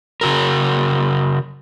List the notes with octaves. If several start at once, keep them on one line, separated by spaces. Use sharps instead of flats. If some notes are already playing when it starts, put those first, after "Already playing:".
C#3 F#4 A#4